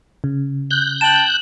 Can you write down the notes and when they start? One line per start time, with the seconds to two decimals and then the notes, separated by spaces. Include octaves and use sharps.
0.24 C#3
0.71 F#6 G6
1.01 G5 A5 E7 F#7